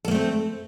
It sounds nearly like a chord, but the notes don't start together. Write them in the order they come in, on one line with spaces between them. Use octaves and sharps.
A4 A#3 A3 C4